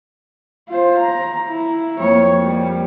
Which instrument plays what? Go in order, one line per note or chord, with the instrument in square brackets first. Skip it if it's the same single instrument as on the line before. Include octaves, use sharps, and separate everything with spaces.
[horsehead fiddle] F4 C5
A#5
E4
[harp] F2 A#3 [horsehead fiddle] C#5
[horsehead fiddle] G3